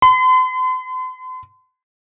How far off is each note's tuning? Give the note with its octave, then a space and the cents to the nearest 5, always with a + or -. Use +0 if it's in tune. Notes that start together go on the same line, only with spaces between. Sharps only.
C6 -45